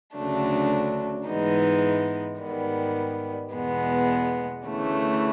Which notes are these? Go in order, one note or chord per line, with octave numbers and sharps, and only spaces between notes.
D2 C#3 F#3 A3 D4
G#2 E3 G#3 B3 D#4
G#2 D#3 G3 B3
E2 B2 G#3 B3
D2 C#3 E3 A3